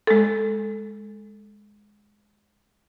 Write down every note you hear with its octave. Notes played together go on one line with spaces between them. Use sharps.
G#3 A4